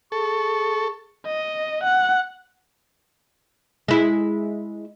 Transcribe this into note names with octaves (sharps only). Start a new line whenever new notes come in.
G#4 A4 C#6
D#5
F#5
G#3 E4